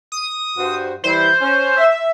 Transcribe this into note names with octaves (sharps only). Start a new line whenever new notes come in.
D#6
G2 F#4 C5
E3 G3 E4 C5
C#4
E5